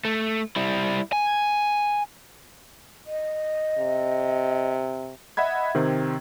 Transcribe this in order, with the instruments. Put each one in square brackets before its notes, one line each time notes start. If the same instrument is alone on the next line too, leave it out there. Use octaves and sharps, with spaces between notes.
[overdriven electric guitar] A3
G3 E4
G#5
[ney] D#5
[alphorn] C3
[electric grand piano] D#5 E5 F#5 B5 G#6
C3 D#3 C4